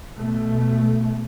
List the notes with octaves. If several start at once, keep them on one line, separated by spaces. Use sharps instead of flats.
B2 A3